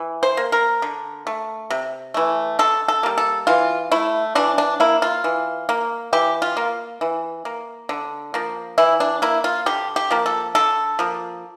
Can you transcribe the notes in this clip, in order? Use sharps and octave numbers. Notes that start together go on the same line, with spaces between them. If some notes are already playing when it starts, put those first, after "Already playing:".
Already playing: E3
C5
A#3
A#4
D3
A3
C3
E3 A3
D3 A4
A4
G3 A#3
A4
E3 F4
A3 E4
E3 D4
D4
A#3 E4
F4
E3
A#3
E3 G4
F4
A#3
E3
A#3
D3
F3 A#3
E3 E4
D4
A#3 E4
F4
D3 G4
G4
F3 A#3
A4
D3 A4
F3 A#3